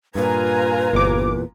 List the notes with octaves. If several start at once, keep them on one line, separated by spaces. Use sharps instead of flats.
G2 A#2 F4 B4 G#5 A#5
G1 E2 A#2 D6